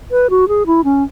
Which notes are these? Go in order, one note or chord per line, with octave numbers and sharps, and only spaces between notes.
B4
F#4
G#4
E4
C#4